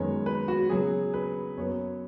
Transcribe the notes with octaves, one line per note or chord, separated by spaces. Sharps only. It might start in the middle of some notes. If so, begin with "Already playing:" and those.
Already playing: F#2 D#3 G#3 B3 C#5
B4
F#4
C#3 F#3 B3 G#4
B4
F#2 F#3 B3 C#5